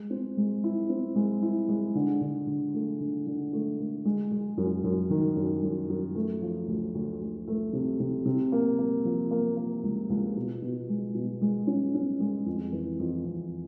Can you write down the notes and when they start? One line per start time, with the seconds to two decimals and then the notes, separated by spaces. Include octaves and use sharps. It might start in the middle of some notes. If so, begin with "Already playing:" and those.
Already playing: G#3
0.10 C4
0.37 G#3
0.64 E4
0.89 C4
1.16 G#3
1.42 E4
1.69 G#3
1.95 D3
2.21 D3
2.47 D3
2.74 A3
3.00 D3
3.26 D3
3.52 A3
3.79 A3
4.05 G#3
4.31 G#3
4.58 F#2
4.84 F#2
5.10 D#3
5.36 F#2
5.63 F#2
5.89 F#2
6.15 A3
6.42 F3
6.68 D2
6.95 D2
7.21 D2
7.48 A3
7.73 C3
8.00 C3
8.25 C3
8.52 A#3
8.79 A#3
9.05 F3
9.31 A#3
9.57 A#3
9.83 C#2
10.10 C#2
10.37 B2
10.62 B2
10.89 G#3
11.15 B2
11.42 G#3
11.67 C#4
11.94 C#4
12.20 G#3
12.46 F2
12.72 E3
12.99 F2
13.25 F2